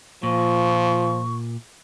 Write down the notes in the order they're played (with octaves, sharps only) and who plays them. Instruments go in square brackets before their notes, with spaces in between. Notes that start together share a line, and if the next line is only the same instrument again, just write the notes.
[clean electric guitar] A#2 [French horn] F3 [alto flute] C#6